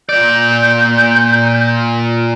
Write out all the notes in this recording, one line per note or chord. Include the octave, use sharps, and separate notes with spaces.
A#2 D5 G6